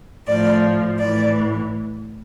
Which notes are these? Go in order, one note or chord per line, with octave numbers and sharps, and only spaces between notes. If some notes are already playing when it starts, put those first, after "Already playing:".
A2 F3 D5
A2 E3 D5